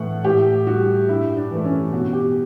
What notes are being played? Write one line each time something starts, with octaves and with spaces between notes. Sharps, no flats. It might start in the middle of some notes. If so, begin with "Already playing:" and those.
Already playing: A2 E3 A3 F#5
A2 G4
G3 F#4
G2 E4
D4
E3 A3
C#4
B2 F#4
G4